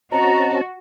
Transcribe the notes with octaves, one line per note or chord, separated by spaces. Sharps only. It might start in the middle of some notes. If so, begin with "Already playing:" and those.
C4 C#4 F#4 D#5 A5 A#5